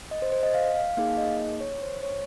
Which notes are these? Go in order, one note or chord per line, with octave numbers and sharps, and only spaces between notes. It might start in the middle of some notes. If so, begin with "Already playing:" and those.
D#5
C5
C5
D#5
F5
F5
A#3 D#4 G#4 F5
D#5
C#5
C5
C#5